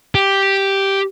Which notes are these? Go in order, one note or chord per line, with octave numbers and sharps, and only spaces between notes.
G4